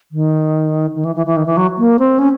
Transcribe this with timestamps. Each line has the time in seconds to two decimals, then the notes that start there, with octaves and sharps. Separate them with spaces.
0.12 D#3
0.95 D#3
1.05 E3
1.16 E3
1.26 E3
1.37 D#3
1.46 E3
1.57 F#3
1.78 A#3
1.99 C4
2.19 C#4